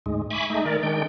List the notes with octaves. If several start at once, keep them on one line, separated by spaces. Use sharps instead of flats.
D2 G#2 G#3
E5 G#5 B5 C#6 D6
G#3 A3 D#4
D#3 A#4 D5
D#3 G#3 D4 G5